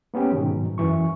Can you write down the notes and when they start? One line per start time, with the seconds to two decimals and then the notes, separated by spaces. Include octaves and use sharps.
0.14 A#3 B3 C#4 G4
0.32 G#2 B2 D#3 F#3
0.78 F#2 E3 C#6